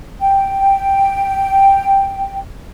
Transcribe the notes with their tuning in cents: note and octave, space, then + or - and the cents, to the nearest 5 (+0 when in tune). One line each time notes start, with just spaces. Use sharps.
G5 +0